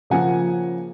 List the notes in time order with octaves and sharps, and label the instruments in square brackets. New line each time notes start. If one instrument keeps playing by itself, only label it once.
[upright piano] C#3 F3 A#3 F#5 G#5